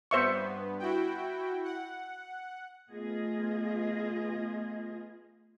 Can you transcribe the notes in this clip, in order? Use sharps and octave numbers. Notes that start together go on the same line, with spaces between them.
G2 B3 C5 E5 C#6
E4 F#4 G5
F#5
A3 B3 F4 G#4 D#5